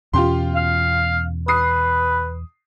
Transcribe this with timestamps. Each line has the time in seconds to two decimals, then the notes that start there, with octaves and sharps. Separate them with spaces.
0.13 E2 B2 C#4 F4 G4 C6
0.55 F5
1.48 B4 D#6 C7